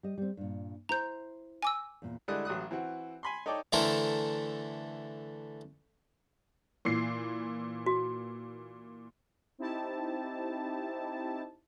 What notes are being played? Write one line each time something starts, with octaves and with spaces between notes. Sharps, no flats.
G3 D#5
G3 C4
G2 A#2
E4 C5 A#5 G6
G#5 D6 E6
E2 A#2
D3 G3 G#3 E4 D#6 F#6
A1 F#3 D#6 F#6
E3 C4 F#4
G#5 B5 C6
D#4 A4 C#5 D5 G5 D6
D3 E3 A3 E4 A#4 C5
A#2 E3 C7
F#4
C4 D#4 E4 G4 A5